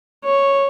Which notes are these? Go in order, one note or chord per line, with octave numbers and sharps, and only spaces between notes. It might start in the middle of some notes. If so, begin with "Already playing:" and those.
C#5